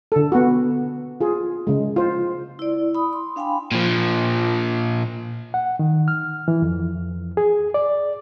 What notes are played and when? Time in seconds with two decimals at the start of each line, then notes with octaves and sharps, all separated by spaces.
0.12 D3 A4
0.32 B3 F#4
1.21 F4 G#4
1.67 C#3 G#3
1.96 F4 C5
2.59 E4 D5
2.95 B5 D#6
3.13 C6
3.36 D4 F5 G5 G#5 B5
3.71 A#2 F3
5.54 F#5
5.79 D#3
6.08 F6
6.48 E3
6.62 F2
7.37 G#4
7.74 D5